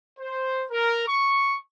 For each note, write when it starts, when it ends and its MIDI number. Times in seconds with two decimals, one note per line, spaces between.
0.19 0.65 72
0.71 1.07 70
1.08 1.58 85